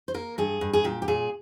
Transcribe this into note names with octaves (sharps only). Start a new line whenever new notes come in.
C5
A#3 A#4
G2 G#4
G2
G#4
A#2 G4
G4
A#2 G#4